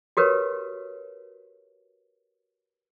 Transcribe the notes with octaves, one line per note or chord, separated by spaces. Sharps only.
F#4 G4 A#4 B4 C#5